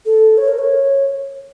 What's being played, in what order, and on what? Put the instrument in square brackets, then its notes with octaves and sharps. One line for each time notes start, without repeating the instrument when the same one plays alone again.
[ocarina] A4
C#5
A#4
C#5